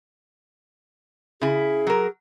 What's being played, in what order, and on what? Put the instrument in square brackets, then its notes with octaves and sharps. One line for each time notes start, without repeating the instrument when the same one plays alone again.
[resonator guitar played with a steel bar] C#3 E4 [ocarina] G#4
[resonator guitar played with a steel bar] F#3 A#4